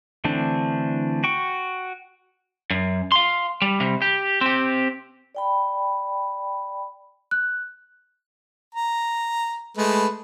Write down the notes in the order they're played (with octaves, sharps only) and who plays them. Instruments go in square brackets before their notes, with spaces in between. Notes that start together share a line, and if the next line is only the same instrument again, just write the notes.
[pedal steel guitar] D3 E3 A3 C4 D4
F#4 G5 C#6
[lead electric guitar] F#2
F5 C6
G3
C3 G3
G4
C4 G4
[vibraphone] D5 G5 B5
[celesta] F#6
[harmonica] A#5
G#3 A3 B4